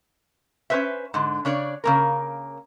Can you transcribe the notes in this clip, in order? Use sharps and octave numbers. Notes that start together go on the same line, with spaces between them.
C#4 D#4 B4 C5 E5
G#2 D3
C#3 D4 C#5 D5
C#3 A#3 A#4